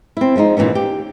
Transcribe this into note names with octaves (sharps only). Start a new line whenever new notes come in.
C4 E4
F3 G#3 B3 D#4
A#2 D#3 E3 C#4
G4